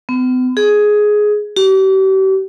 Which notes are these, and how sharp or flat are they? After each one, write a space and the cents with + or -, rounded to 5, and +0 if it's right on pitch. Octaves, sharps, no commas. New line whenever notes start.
B3 +45
G#4 +10
G4 -40